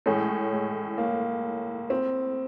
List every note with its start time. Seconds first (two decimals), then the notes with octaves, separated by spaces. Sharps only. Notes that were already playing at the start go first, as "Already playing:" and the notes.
0.06 A2 E3 G#3 A3 C#4
0.53 G#3
0.98 A#3
1.90 C4